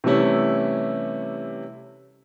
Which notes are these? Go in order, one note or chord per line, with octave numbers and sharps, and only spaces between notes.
C3 E3 G3 A3 C#4 E4